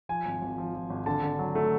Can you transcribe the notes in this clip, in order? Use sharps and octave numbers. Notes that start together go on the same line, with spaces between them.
F3 G#5
G#1
G#1
F3
F3
G#1
D3 A5
D3
F#3
A3